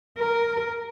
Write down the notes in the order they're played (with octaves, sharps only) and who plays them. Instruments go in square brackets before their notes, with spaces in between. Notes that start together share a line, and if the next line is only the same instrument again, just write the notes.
[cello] A#4